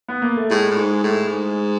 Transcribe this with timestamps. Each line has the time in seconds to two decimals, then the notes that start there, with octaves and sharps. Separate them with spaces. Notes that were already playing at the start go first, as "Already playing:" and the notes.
0.08 B3
0.22 A#3
0.36 A3
0.50 A2 G#3
0.70 A2
0.77 G#2
1.03 A2
1.29 G#2